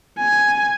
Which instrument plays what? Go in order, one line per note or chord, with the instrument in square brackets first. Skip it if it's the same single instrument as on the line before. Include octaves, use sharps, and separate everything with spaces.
[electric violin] G#5